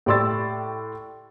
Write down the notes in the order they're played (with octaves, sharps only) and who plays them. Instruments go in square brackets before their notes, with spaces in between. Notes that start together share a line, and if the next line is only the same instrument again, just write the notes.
[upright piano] A2 G4 D5 C6 E6 A6